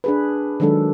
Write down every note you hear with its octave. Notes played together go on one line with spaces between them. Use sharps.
D4 G#4 B4
D#3 F#3 G#3 D4 A4